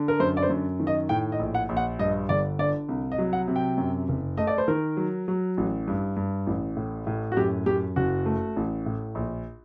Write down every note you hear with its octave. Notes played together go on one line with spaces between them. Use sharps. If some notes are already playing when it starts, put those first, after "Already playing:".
Already playing: D3
A#4
F#2 C5
D5
C5
F#2
D#3
D#5
A2 G5
D#5
A#1
F#5
A#1
F#5
G2 D#5
G1 D5
D3 D5
C2
D#5
F#3
F#5
C3
G5
F#2
F#1
A3 D#5
D5
C5
D#3 A#4
F#3
F#3
A1
G2
G2
A1
A2
A2
F#4
F#2 G4
F#2 G4
F#1 F#4
A3
A1
A2
A#1